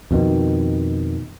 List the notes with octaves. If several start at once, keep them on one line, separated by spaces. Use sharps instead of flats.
F2 B2 D#3